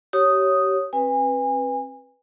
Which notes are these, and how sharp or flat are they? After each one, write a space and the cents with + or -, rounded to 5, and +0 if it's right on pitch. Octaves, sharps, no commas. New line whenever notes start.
G4 -25 C#5 +0 D#6 +0
C4 +40 B4 +0 G#5 -35